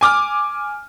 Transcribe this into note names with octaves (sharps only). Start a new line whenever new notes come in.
G#5 D6 F6